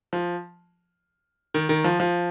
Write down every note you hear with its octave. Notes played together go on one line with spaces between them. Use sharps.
F3
D#3
D#3
F3
F3